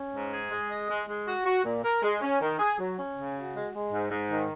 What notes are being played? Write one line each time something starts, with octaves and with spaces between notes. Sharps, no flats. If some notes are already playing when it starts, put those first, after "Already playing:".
Already playing: C#4
G#2
G#4
G#3
D#5
G#3
G#3
F#4
F#4
A#2
A#4
G#3
C#4
D#3
G#4
F#3
C#4
C#3
F#4
G#3
G#3
G#2
G#2
D#3